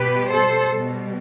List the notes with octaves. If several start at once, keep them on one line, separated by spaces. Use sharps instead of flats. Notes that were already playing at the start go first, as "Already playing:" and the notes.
Already playing: B2 G3 G4 B4
A4 C5
B2 G3